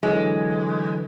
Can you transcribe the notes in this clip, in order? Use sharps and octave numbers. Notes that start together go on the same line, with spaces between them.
D3 E3 F#3 G#3